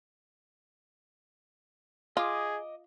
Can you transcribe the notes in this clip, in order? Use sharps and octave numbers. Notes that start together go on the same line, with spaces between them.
F4 G#4 D#5 D6